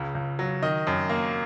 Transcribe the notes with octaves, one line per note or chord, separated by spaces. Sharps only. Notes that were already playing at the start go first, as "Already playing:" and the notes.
Already playing: C#2 C#3
C#2
F#3
D#3 D#5
F#2
A#3